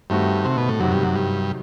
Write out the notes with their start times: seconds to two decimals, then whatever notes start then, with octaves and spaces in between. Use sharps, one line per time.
0.10 G2 D#3 A3 C4 F#4
0.45 C3
0.57 B2
0.69 A2
0.80 F#2 C3 D#3 F#3
0.91 G2
1.04 F#2
1.15 G2